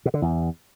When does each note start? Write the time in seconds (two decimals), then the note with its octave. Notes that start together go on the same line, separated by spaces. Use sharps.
0.05 B2
0.14 D3
0.22 E2